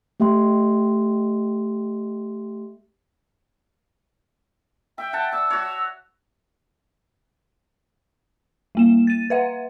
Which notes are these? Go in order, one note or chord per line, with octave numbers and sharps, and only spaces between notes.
A3 G4 E5 G5 C6
E5 G5
F#5 A5
D5 E6
F#4 C#5
G3 A#3 E7
A6 D#7
B4 E5 F#5